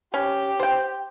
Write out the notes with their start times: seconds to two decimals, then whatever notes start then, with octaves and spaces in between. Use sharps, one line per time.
0.14 C#4 G4
0.60 C5 G5